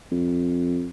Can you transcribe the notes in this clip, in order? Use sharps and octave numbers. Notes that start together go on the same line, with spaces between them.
F2